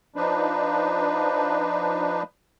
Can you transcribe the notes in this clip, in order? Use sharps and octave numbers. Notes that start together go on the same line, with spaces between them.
F3 D4 D#4 B4